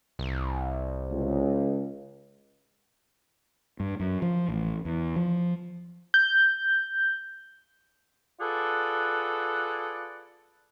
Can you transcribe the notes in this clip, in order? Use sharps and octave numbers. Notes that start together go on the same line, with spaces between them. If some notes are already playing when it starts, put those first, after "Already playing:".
C2
C#2
G2
F#2
F3
A1
E2
F3
G6
F4 G#4 A4 B4 D5 F#5